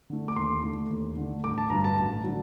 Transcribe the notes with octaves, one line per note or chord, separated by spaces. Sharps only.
D3 A3
D6
D#2 C6
D3 A3
D#2
D3 A3
A1 D6
A5
G2 D3 F#3 A#5
A5
A1
D3 F#3